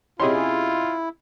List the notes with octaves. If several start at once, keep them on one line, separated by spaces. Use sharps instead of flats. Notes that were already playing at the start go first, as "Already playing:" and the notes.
C3 C#4 E4 F4 G4 G#4 D#5 C6